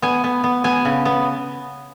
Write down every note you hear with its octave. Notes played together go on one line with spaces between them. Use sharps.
B3 G#5
B3
B3
B3 G#5
C#3
B3